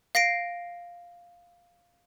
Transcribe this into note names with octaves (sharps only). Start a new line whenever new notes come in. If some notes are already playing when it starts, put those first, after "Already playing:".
F5 A#6 C7 D7